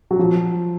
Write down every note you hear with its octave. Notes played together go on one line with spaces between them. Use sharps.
F#3
F3